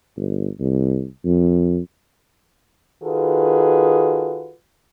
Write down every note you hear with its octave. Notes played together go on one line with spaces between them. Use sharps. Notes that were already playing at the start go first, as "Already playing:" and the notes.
G1
C2
F2
D#3 F4 F#4 G#4 A4 B4